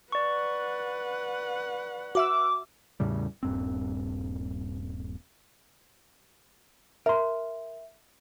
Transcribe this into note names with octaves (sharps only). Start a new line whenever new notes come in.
B4 D5 F#5 C#6
F#4 E5 D6 E6
E2 A2 C#3 G3
D#1 G2 C4
A#4 E5 C6